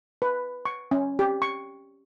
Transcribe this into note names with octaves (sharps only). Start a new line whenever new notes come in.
B4
C#6
C#4
G4
C#6